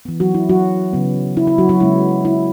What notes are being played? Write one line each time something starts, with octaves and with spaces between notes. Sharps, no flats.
E3 B3
F#3 F#4
E4
F#3 F#4
C#3 F#3 B3
E4
E4
F#3 F#4
F#3 F#4
C#3 G#3 B3 E4
E4